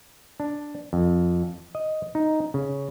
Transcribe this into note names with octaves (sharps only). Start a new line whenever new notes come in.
D4
F2
D#5
D#4
C#3